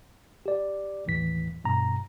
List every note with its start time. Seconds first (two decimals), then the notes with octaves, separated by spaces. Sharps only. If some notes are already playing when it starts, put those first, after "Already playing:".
0.46 G4 D5
1.06 A#1 D#2 A2 E3 B6
1.64 G2 B2 A#5